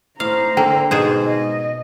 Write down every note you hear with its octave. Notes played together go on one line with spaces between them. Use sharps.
A2 C5 F5 A#5
D3 A#3 A4 G5
G#2 B2 G#3 G#4 C5
D#5